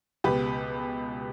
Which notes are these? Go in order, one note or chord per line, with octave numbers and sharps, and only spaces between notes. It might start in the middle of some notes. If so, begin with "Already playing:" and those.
C#2 B2 G4 B4